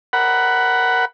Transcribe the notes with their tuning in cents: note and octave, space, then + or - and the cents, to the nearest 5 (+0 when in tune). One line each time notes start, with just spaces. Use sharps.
A#4 +0 F#5 +15 B5 +0